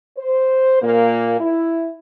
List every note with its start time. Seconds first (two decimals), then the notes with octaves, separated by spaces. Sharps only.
0.18 C5
0.82 A#2 A#3
1.39 E4